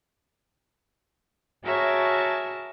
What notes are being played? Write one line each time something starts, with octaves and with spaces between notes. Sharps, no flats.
F#4 G#4 A#4 C#5 E5 A5